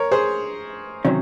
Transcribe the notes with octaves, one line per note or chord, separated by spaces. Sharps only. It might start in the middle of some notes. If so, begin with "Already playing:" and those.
Already playing: A#4 C#5
G#4 C5
C3 D#3 F#3 C#4